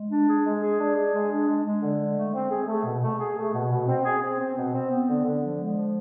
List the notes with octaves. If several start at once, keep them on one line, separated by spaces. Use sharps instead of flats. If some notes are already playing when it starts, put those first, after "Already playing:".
Already playing: G#3
D4
G#4
G#3
G#4
D4
G#4
G#3
D4
G#3
G#3
D3
G#3
A3
C4
G#4
A3
B2
A3
G#4
A3
B2
B2
C4
G#4
C4
C4
B2
C4
B3
D3
D3
F3
G#3
F3